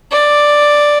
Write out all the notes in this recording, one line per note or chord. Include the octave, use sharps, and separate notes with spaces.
D5